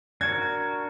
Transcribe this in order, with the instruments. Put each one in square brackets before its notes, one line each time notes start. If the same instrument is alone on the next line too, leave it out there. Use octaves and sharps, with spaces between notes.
[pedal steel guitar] D4 F#4 A#4 [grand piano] G#6